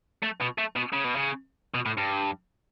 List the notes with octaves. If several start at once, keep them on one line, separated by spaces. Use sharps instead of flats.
A3
B2
A3
B2
C#3
B2
C#3
B2
A2
G2